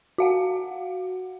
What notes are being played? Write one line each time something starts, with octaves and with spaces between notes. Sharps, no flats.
F#4 F5 F#5